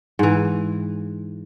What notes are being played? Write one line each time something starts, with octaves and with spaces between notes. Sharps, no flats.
G#2 E3